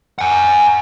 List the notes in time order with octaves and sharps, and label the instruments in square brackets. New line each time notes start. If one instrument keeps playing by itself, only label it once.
[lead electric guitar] F#5 G#5